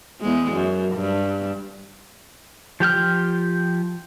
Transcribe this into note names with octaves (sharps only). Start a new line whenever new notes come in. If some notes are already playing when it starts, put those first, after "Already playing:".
E2 G#3
F#2
G2
F3 G4 G5 F6